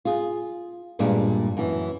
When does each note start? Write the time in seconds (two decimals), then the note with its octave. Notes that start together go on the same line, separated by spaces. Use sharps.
0.05 F4 G#4
0.99 G2 A#2 G3 G#3 B3 D4
1.57 F#2 E3